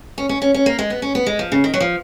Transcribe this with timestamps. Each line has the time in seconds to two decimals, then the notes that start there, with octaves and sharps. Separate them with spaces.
0.18 C#4
0.29 C#4
0.42 C#4
0.54 C#4
0.66 A#3
0.79 G#3
0.90 B3
1.02 C#4
1.15 B3
1.27 G#3
1.39 F3
1.52 C#3
1.64 D#3
1.74 F#3
1.81 F3